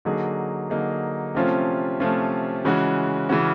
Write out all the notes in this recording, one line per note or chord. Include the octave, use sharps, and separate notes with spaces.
D3 F#3 A#3 D#4 G#4
D3 F#3 A#3 D#4 G#4
C3 F3 A3 C#4 F4
C3 F3 A3 C#4 F4
C#3 E3 G#3 C#4 F#4
C#3 E3 G#3 C#4 F#4